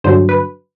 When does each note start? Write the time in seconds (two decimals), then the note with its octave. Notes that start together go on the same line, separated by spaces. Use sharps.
0.04 G2 D3 F#3 C5
0.29 B4